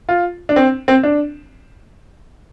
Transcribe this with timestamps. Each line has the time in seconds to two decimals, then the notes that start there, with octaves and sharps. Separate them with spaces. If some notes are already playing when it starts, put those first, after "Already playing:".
0.09 F4
0.49 D4
0.56 C4
0.88 C4
1.03 D4